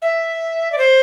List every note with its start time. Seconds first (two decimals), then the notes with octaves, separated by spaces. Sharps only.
0.02 E5
0.72 D5
0.78 C5